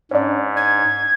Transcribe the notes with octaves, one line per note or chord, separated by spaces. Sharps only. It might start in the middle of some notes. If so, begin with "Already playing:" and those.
G#2 C#4 D4
G#6